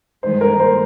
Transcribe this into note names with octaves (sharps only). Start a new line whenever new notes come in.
G2 D#3 G#3 C5
A#4
C5